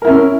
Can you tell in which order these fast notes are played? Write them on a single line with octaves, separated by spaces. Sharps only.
A#4 E4 C#4